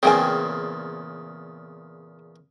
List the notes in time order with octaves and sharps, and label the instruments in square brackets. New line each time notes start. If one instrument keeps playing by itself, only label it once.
[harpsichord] E2 A#2 C#3 [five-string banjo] C4 G5 G#5